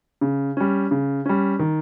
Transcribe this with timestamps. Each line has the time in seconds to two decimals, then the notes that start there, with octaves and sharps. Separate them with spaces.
0.21 C#3
0.57 G3 C#4
0.91 C#3
1.26 G3 C#4
1.59 D#3